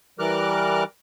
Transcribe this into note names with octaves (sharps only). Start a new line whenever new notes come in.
E3 G3 A#4 D6 F6 F#6